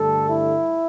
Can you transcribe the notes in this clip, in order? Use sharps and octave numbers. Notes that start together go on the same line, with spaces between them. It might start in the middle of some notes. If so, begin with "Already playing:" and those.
Already playing: G2 D3 A3 A4
E4